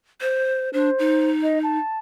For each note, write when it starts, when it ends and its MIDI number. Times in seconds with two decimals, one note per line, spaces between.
0.21 0.69 72
0.73 0.90 62
0.73 1.29 72
0.99 1.78 63
1.43 1.59 75
1.63 1.99 81